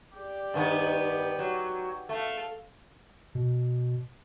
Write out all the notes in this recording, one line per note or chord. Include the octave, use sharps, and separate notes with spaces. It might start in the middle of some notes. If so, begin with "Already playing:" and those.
G4 D5
G2 D#3 B3
F#3
A3 A4 F5
B2